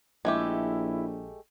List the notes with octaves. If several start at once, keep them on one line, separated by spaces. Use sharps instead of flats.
A#1 G#3 A3 E4 G4